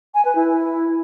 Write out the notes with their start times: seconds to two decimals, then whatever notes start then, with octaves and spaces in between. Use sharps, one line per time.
0.15 G#5
0.25 B4
0.35 E4